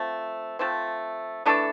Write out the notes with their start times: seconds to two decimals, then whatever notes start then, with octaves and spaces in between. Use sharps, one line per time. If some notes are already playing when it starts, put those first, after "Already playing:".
Already playing: F3 A3 C4
0.59 F3 A3 C4
1.46 E3 A3 D4 A4